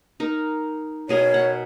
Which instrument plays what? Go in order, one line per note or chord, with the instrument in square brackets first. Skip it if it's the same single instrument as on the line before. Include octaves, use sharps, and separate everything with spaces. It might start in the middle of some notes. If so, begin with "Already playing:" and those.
[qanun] D#4 A#4
[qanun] B2 G#4 A#4 [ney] C#5
[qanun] F#5